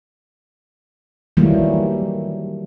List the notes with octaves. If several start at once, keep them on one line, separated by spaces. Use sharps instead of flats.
D#3 E3 F#3 G3 A3 A#3